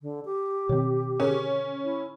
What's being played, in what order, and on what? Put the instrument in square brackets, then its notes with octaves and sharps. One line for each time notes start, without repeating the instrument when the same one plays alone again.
[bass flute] D3
G4
[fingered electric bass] B2 D#3 [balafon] C4 C#5
[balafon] D3 G#4 A#4 [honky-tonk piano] C#4
[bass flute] E4